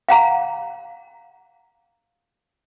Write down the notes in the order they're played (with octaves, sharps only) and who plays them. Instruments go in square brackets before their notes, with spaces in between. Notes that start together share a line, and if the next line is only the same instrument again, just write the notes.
[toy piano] F5 F#5 A#5